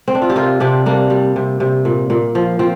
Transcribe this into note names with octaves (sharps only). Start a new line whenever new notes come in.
C4
D4
F4
G4
C3 F4 A#4
C3 D4 G4
G3 A#3 D4
G3
C3
C3
A#2
A#2
F3
F3 C4